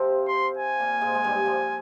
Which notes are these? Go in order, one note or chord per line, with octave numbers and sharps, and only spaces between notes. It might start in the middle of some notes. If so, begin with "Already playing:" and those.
Already playing: C3 F3 C4
C6
G#5
A#2 A#3
G#2 G#3
G#3
G2 G3
F3